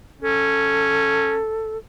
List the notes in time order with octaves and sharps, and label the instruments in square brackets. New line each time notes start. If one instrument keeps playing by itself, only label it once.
[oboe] C#4 [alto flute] A4